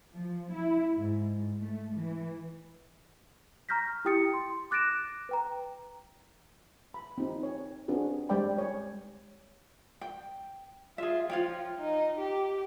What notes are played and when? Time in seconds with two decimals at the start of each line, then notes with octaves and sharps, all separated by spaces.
0.13 F3
0.53 E4
0.95 G#2
1.60 A3
1.95 E3
3.69 A#5 C#6 F6 G6 A#6 B6
4.05 E4 G4 G5 D#6 A6 C#7
4.33 C6
4.71 D6 F#6 A6 A#6 D7 E7
5.29 B4 G5 A#5
6.94 B5
7.18 C4 D#4
7.43 C#5
7.88 C4 D4 F#4 G#4 B4
8.29 G3 G#3 C5 D5 G5 B5
8.58 C#5
10.01 G5
10.98 F4 G#4 E5
11.30 F3 F4 C#5 G5
11.80 D#4
12.19 G4